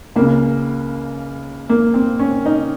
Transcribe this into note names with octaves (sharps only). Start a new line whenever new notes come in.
C#2 C#3 A#3
A#3
C4
C#4
D#4